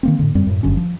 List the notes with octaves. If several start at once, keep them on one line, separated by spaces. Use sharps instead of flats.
D#3 A#3 C4
A2 D3
F#2 G3 C4
F#2 A2
G1 F#2 D3 C#4
F3